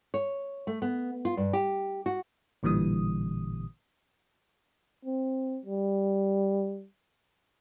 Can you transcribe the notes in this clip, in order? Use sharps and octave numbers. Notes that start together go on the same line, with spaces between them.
C#5
A3
B3
F4
G2
G4
F#4
A1 A#2 D3 E3 G3 D#6
C4
G3